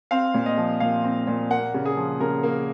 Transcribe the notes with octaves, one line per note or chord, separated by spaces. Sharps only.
C4 F5
A#2
D#5
F3
A#2 F5
C4
A#2
A#3 F#5
C#3
G#4
F3
C#3 A#4
A#3